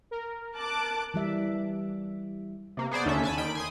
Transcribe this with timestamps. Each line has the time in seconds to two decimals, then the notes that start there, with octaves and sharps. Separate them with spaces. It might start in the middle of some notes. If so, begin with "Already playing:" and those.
0.11 A#4
0.57 A5 D6 F#6
1.14 E3 G3 E5
2.77 C3 A#3
2.91 B3 G#4 C5 D5
3.05 D#2 D3 C#4 A4 E5
3.24 G#5 A5 B5
3.37 D#3 G5 B5 D7
3.55 G#5 C6 D#6